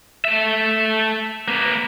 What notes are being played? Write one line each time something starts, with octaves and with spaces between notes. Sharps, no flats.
A3 E5
A#3 B4